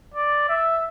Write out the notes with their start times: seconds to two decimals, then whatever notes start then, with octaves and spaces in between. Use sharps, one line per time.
0.14 D5
0.49 E5